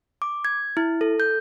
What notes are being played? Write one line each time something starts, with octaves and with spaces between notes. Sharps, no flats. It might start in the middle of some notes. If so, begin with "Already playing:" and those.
D6
G#6
E4
A4
G6